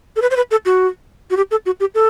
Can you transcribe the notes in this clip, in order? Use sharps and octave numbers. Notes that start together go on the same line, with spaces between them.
A4
B4
C5
B4
A4
F#4
F#4
G4
A4
F#4
G4
A4